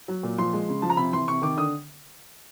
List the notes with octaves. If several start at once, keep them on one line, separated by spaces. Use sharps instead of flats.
F#3
A#2
F3 C6
G#3
C#3
F3 A5
A#5
C3 B5
E3 C6
C3 C#6
D#3 D6
D3 D#6